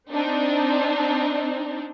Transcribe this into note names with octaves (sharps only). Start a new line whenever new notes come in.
C4 D4 D#4